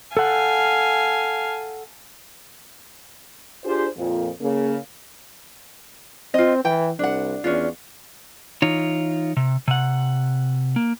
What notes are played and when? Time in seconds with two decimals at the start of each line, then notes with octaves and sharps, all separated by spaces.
0.17 A4 F5 F#5 G#5 A5
3.64 D4 F4 G4 G#4 C5
3.96 F2 A#2 F3
4.41 C#3 A#3
6.34 C4 F4 D#5
6.65 E3 G5
6.99 C2 D4 F#5
7.44 E2 C#4 D4 F4
8.62 E3 D#4 F4 C#5
9.37 C3
9.68 C3 F#5
10.76 A#3